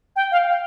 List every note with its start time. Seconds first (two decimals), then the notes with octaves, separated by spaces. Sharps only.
0.16 G5
0.32 F5
0.47 F5